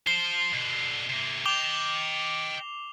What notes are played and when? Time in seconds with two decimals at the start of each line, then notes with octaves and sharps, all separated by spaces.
0.07 F3 C5 C7 G7
0.53 B2 D3
1.09 C3 A#3
1.46 D#5 G5 D6 F7 G7